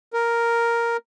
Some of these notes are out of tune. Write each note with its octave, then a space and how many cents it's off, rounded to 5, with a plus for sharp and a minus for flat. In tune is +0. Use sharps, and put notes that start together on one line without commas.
A#4 +0